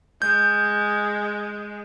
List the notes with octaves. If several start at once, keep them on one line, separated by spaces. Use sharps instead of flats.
G#3 G6